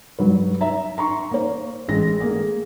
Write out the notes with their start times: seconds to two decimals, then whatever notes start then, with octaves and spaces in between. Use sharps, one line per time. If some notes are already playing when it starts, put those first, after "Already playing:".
0.19 G2 F#3 B4
0.61 E5 A#5
0.98 A#5 C6 C#6
1.31 A#3 C5
1.88 A1 G#3 A#6
2.20 A3 A#3 G#4